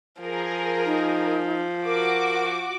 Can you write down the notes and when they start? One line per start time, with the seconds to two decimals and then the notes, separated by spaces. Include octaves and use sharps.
0.21 F3 G#4 A#4
0.86 D#4
1.85 F#4 A#4 D6